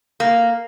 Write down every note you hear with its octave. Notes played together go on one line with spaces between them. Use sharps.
A#3